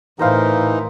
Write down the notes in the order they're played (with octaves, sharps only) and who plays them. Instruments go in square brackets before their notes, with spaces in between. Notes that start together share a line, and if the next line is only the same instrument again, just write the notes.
[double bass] A2 [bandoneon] E3 D#4 [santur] A#4 C5 F5